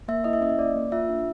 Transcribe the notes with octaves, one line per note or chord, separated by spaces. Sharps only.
A#3 E5
E4 D#5
E5
C#4 D#5
A#3 D5
A#3
F4 E5
D4